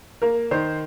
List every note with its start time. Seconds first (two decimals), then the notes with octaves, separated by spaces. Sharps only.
0.22 A#3 A#4
0.51 D#3 C5